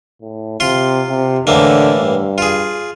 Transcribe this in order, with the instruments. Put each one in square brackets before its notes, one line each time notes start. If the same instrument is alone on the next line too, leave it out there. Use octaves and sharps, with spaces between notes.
[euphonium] A2
[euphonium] C3 [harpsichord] F4 C6
[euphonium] C3
[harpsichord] A2 E3 A#3 [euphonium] D3
[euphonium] G2
[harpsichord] F4 G#4